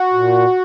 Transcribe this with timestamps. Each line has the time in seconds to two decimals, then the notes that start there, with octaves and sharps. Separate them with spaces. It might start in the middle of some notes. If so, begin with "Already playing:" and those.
Already playing: F#4
0.14 A#2